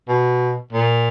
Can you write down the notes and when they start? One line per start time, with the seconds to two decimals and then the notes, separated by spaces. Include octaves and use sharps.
0.08 B2
0.73 A#2